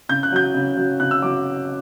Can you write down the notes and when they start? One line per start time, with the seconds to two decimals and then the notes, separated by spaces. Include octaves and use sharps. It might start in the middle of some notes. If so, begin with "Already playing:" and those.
0.09 C#3 G6
0.23 F#6
0.32 F#3 G6
0.54 C#3
0.77 F#3
1.00 C#3 F#6
1.11 E6
1.22 F#3 D6